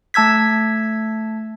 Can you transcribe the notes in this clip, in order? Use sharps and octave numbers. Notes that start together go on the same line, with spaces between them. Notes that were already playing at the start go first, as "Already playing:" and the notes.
A3 A5 E6 G#6 B6